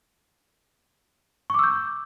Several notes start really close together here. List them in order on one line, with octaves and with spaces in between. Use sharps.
C#6 D6 E6 G6